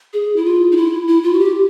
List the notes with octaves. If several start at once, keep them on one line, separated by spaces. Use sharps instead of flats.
G#4
E4
F4
D#4
E4
E4
F4
F#4
G4